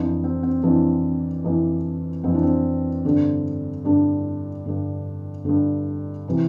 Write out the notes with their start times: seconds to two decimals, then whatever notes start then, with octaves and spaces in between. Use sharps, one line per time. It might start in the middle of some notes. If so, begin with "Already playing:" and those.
Already playing: F2 E3 D4
0.24 C4
0.43 C4
0.63 F2 E3 D4
1.44 F2 E3
2.24 F2 E3 C4
2.34 D4
2.43 C4
3.05 G2 D3
3.85 G2 D3 D4
4.66 G2 D3
5.45 G2 D3
6.28 C3 E3